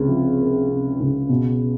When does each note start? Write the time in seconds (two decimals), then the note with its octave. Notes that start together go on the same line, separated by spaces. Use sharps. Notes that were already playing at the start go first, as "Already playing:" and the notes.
Already playing: C#2 C3
0.08 F3
0.39 A#3
0.69 C3
1.00 C#2
1.29 B2